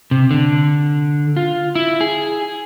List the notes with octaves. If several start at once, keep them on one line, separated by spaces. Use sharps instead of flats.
C3
D3
F4
E4
G#4